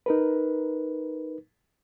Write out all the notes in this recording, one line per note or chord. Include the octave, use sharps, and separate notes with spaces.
D#4 A#4 B4